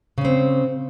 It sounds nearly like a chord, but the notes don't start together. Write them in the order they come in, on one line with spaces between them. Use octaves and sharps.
C#3 C#4 C4